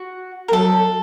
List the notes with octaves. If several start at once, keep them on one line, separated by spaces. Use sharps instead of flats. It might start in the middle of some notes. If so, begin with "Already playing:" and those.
Already playing: F#4
A#4
F#3 A4